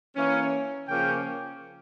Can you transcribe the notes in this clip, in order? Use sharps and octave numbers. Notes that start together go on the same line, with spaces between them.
E3 A#3 C#4
C#3 F3 A#3 C#4 G5